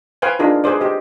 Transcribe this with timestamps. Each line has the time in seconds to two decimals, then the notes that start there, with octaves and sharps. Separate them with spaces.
0.22 B4 C5 F5 G5 G#5
0.39 D4 D#4 F4 G#4 A#4
0.64 G#4 B4 C5 D5
0.81 G4 C5 D#5